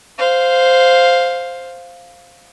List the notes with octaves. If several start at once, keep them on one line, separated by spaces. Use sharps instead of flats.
C5 F5